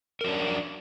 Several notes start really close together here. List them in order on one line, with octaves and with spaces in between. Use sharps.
A#4 F#3 D4